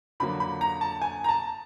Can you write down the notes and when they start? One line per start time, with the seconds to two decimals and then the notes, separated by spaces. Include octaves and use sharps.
0.20 F2 D3 F#3 A#3 B5
0.40 B5
0.61 A#5
0.81 A5
1.01 G#5
1.24 A#5
1.29 A5